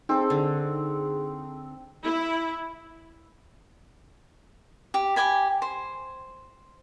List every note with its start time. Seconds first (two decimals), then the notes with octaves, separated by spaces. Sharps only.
0.09 C4 D#4 G#4 A4
0.30 D3
2.05 E4
4.94 G4
5.16 G4 G5 G#5 B5
5.62 C5